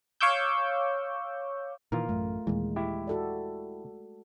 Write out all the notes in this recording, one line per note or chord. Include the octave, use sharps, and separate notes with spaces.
C#5 F5 C#6 D6 E6 G6
A#2 D#3 E3 F4 A#4
A1 F#2 A3
D#2 A#2 E3 G#3
E4 G4
F#4 A4 D5